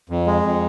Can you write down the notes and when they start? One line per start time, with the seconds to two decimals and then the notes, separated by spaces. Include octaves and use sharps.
0.09 F2
0.27 G#3
0.43 F2